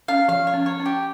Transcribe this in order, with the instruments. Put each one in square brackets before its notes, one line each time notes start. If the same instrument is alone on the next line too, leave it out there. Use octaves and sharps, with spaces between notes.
[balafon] C#4 [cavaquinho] F5
[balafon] F3 [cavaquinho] F5
[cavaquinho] C#5
[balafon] C#4
[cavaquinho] C#5
[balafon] C#4
[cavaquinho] G4